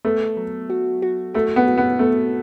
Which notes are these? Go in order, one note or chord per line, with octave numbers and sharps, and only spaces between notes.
A3 B3
F#3
F#4
F#4
A3 F#4
B3
F#4
B3
A3 B3